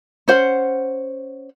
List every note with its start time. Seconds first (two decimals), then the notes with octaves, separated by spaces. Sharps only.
0.28 C#4 C5 F#5